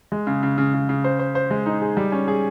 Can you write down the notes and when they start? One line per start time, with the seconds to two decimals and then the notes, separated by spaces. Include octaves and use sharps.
0.12 G#3
0.27 C#3
0.43 C#3
0.58 C#3
0.74 C#3
0.89 C#3
1.04 C5
1.19 C5
1.35 C5
1.51 G#3
1.66 D#4
1.82 G#4
1.97 G3
2.12 C#4
2.28 G#4